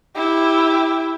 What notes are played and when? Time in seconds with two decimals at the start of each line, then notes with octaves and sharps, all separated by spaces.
0.16 E4 G4